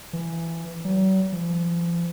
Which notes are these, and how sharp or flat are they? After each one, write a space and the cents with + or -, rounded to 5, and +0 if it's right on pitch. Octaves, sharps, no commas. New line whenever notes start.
E3 +15
F#3 +45
F3 -40